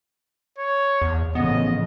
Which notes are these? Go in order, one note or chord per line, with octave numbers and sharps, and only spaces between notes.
C#5
E2
A1 C#3 F3 B3 D#5